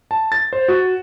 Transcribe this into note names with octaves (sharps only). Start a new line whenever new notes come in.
A5
A6
C5
F#4